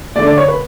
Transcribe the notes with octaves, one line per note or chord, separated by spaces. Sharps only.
D3 A3 D5
D5
C#5
B4